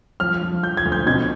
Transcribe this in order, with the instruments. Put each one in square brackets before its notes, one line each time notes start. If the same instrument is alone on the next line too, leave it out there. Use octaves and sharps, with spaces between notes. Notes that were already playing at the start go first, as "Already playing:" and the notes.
[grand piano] F3 F6
F3
F3 G6
G#6
D2
G6
B2 G#6